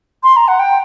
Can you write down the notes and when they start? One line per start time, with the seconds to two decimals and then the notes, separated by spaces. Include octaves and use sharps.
0.24 C6
0.37 A#5
0.48 F#5
0.59 G5